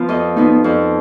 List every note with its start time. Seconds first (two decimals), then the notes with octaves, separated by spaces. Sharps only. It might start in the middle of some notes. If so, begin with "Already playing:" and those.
Already playing: F3 B3 F4
0.09 F2 D#5
0.37 F3 B3 D#4
0.64 F2